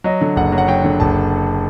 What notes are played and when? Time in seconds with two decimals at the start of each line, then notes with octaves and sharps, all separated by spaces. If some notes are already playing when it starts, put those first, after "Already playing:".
0.04 F#3 D#5
0.21 D3
0.36 F#1 F#5
0.52 F#3
0.58 F#5
0.68 F#3 G5
0.84 D3
1.00 F#1 A5